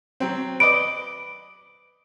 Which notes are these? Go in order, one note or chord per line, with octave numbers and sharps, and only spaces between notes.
F#3 C4
B4 D5 D#5 D7